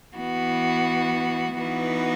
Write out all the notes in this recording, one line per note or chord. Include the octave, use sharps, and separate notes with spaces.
E3 B3 F#4
E3 B3 D#4 F#4 B4